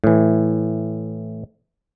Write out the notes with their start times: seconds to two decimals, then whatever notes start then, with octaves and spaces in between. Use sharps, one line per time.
0.04 A2 E3